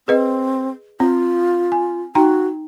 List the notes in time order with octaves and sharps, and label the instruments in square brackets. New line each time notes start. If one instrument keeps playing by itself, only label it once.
[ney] C4 [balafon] G#4 B4 D#5
[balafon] C4 [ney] F4
[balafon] G#5
[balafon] D#4 G5 A#5 [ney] F#4